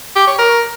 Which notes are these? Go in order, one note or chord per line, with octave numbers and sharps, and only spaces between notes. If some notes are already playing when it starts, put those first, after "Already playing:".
G4
C#5
A#4